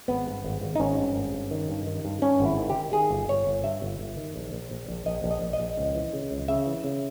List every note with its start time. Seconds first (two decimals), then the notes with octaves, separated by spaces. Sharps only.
0.08 G#1 B3
0.27 G2
0.44 G#1
0.61 G#1
0.75 D#4
0.79 G#1 C#4
0.98 G2
1.16 G#1
1.33 G2
1.51 D#3
1.69 G2
1.87 D#3
2.05 G2
2.22 G2 C#4
2.40 G#1
2.46 E4
2.58 D#3
2.70 G4
2.76 D#3
2.93 D#3 G#4
3.11 G1
3.28 G1 C#5
3.47 G1
3.64 G2 E5
3.82 G1
3.99 G1
4.17 D#3
4.36 A#1
4.53 A#1
4.71 A#1
4.89 A#1
5.06 A#1 D#5
5.24 A#1
5.31 D#5
5.42 A#1
5.53 D#5
5.60 A#1
5.77 C#2
5.95 E3
6.13 C#3
6.31 C#2
6.48 C#3 E5
6.66 E3
6.84 C#3